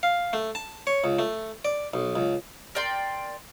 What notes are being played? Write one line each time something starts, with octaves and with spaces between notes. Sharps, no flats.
F5
A3
A5
C#5
C#2
A3
D5
B1
C#2
A#4 D5 G5 C6